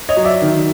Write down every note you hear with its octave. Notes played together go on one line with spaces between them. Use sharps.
C#5 D#5
F#3
D5 E5
D#3